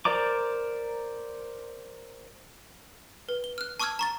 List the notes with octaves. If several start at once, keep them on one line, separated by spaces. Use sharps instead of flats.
A#4 C5 D5 A#5 D6
B4
G7
F6 F#6
A5 C#6 D6 E6 F6 G#6
A#5 C#6 A6